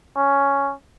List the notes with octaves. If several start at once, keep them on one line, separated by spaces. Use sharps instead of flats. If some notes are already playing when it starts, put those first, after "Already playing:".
C#4